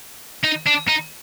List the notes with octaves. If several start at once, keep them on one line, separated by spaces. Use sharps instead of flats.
D#4
D4
D#4